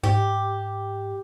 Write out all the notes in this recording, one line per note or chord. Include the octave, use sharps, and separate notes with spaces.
G#2 G4